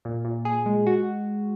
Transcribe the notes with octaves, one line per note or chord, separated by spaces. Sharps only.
A#2
A#2
G#4
G#3
F#4